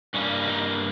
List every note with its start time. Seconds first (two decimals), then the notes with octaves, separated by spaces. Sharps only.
0.14 G2 G3 A#3 C#4
0.44 C#4
0.47 D#4